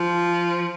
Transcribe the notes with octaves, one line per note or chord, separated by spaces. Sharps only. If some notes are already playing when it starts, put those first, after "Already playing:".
Already playing: F3